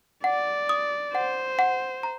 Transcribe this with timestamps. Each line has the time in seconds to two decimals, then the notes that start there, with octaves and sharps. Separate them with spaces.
0.24 D5 F#5
0.69 D#6
1.13 C5 F#5
1.59 F#5
2.03 A#5